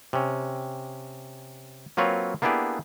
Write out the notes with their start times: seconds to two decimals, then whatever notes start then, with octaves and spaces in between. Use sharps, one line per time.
0.13 C3 C#4
1.97 F#3 A#3 C4 F4 B4 C#5
2.42 A#3 B3 D4 E4 G4 G#4